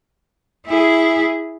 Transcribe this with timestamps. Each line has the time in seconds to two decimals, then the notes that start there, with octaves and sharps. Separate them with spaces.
0.67 E4 G#4